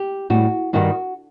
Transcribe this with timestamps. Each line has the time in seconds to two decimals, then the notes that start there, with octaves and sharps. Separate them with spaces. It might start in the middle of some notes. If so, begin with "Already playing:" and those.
Already playing: G4
0.30 A2 G3 F#4
0.73 G2 D#3 G3 F#4